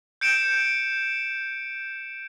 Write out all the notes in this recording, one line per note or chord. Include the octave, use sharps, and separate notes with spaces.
G6 C#7 D7 E7